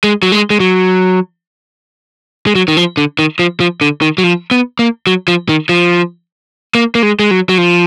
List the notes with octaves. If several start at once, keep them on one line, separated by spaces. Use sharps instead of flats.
G#3
F#3
G#3
G#3
F#3
G#3
F#3
D#3
F3
D3
D#3
F3
F3
D3
D#3
F#3
F3
B3
A#3
F#3
F3
D#3
F3
A#3
A#3
G#3
G#3
F#3
F#3
F3